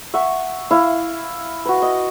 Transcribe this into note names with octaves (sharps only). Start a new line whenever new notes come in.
E5 F#5 C#6
E4 E5 F5
F#4 B4
D#5